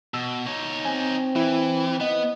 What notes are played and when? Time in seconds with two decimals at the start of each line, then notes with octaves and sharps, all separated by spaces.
0.14 B2 E6
0.46 D#4 C#5
0.85 C4 G#5
1.36 E3 E4
2.00 B3 D#5